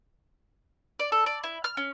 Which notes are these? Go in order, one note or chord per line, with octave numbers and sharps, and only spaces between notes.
D5
A4
D5
E4
F6
C#4